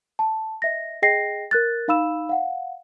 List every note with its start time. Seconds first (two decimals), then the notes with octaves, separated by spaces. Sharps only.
0.19 A5
0.62 D#5 E5 A#6
1.02 G#4 D#5 G5 A#6 C7
1.51 A#4 F#6 A6
1.88 D#4 F5 B5 E6 E7
2.29 F5 F#5